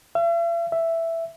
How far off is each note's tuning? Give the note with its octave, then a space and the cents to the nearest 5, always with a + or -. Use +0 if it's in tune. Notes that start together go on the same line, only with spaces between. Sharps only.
E5 +45
E5 +5